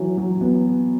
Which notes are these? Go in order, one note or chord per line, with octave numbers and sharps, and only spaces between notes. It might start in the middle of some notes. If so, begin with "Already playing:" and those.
Already playing: E3 F#3
F#3
B3